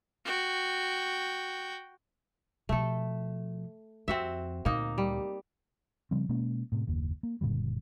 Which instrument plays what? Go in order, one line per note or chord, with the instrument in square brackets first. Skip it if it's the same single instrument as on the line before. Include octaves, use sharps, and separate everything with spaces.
[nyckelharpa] F#4 G5
[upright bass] B2 F3 [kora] A3 A4
[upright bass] F2 [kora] C4 F#4 E5
[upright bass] D2 A#2 [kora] A#3 D#4
[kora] G3
[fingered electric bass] C#3 F3 G3 C4
B2 G#3 A#3 C#4
A2 C3
F#1 D#2 A#3
A#3
F#1 A#2 D3 G3